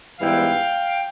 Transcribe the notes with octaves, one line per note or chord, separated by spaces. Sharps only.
G#2 E3 G3 B3 E4 F5 G5